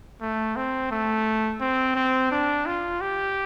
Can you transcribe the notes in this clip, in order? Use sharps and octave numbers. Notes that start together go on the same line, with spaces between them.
A3
C4
A3
C4
C4
D4
F4
G4